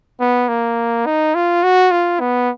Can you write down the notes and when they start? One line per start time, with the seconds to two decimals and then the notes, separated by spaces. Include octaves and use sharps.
0.20 B3
0.49 A#3
1.06 D#4
1.35 F4
1.63 F#4
1.91 F4
2.20 B3